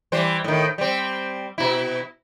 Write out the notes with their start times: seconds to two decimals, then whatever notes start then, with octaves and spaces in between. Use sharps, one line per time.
0.12 E3 G3 C5
0.44 A2 D#3
0.78 G3 C4
1.58 B2 E4